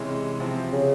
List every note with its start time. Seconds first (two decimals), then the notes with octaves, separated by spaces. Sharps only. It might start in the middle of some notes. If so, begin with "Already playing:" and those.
Already playing: C3 E3 G#3 C#4
0.40 C3 F3 C4 E4
0.72 C#3